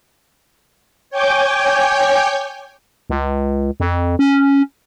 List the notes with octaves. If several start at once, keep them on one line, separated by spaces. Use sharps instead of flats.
C#5 G5 G#5 D6 G6
C#2
F2
C#4